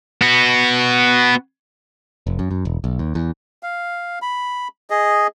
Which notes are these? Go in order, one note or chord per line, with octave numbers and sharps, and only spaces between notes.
B3 F#4
F1
F#2
F#2
E1
B1
D#2
E2
F5
B5
G#4 D#5